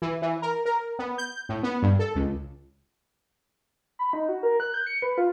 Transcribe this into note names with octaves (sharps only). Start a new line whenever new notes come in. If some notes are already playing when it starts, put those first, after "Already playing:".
E3
E3
A#4
A#4
B3
G6
A2
B3
G2
A4
C#2
B5
D#4
F#4
A#4
F#6
G6
C#7
B4
F4